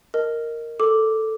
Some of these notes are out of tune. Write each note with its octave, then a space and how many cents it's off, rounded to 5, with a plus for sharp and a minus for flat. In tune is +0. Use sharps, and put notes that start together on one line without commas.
A#4 -5 D#5 +0
A4 +0 D6 +0